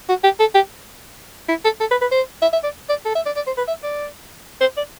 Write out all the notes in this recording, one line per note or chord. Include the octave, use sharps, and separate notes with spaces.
F#4
G4
A4
G4
E4
A4
A4
B4
B4
C5
E5
E5
D5
D5
A4
E5
D5
D5
C5
B4
E5
D5
C5
D5